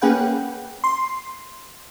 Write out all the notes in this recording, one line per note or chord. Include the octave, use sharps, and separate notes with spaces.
A#3 C#4 G#4 B4 F#5 G5
C6